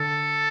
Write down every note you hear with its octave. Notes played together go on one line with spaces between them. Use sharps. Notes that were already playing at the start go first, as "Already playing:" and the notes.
Already playing: D3 A4